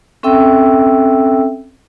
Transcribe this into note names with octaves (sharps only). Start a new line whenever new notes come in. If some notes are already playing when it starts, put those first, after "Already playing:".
C4 C#4 A4 E5 G5 E6